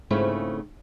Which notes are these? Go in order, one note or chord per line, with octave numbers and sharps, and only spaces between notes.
G#2 C#3 A3 C4 E4 F4